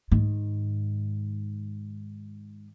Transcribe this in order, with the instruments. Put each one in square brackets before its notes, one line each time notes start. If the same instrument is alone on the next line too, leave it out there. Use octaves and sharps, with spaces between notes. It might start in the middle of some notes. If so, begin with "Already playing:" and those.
[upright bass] G#2 D#3